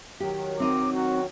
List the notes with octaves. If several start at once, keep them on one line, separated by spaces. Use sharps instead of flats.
D#3 F#3 G4
C4 D#4 D6
F#4